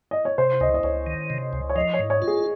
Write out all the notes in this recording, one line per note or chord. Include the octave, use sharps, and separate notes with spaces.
D#5
C#5
C3 C5
C#2 D#5
D#5
C#2 C#5
D#3
C3
C#2
C#5
F3 D#5
C#5
G#2
C#5
F4
G#4